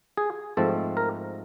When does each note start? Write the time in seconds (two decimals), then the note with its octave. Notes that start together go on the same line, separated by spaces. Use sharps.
0.17 G#4
0.57 G#2 F3 A3 C4 A4
0.97 A#4